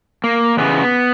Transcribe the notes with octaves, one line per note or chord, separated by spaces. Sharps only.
A#3
E2 C#3 B3